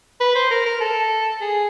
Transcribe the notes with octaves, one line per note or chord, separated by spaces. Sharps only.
B4
C5
A#4
A#4
A4
G#4